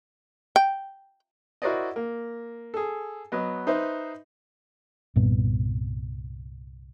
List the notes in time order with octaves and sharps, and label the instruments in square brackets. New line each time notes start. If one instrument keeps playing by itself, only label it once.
[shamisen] G5
[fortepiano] E4 F#4 A#4 C5 D5 D#5
A#3
G#4 A4
F#3 B3 D#5
D#4 B4 C5 E5
[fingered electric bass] C2 G2 A#2 B3